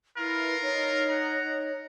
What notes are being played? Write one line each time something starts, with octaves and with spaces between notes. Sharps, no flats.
E4 F4 A#4 B4
D#4 C#5
F#5 A#5